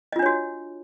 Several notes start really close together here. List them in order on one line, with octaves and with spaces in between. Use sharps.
D#5 F4 D4 C#5 F#4